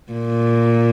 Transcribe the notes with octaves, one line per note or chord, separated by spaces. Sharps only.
A#2